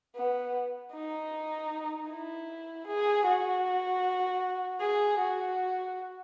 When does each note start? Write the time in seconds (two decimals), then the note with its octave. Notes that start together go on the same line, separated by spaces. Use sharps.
0.16 B3
0.93 D#4
2.09 E4
2.87 G#4
3.26 F#4
4.81 G#4
5.19 F#4